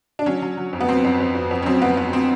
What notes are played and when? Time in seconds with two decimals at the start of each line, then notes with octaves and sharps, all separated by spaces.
0.19 D4
0.26 F#3 C#4
0.42 F#3
0.57 F#3
0.73 F2
0.80 B3
0.89 F#3 C4
1.04 F2
1.20 F2
1.35 F2
1.51 F2
1.62 C#4
1.66 F#3 C4
1.82 F2 B3
1.97 F2 B3
2.13 C4